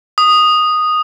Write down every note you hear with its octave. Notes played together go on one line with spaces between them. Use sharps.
D#6